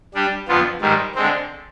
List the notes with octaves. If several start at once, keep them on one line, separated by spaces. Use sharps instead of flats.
G3 D4 G4
F2 D3 F3 B3 F4
G#2 D#3 G3
D3 G#3 C4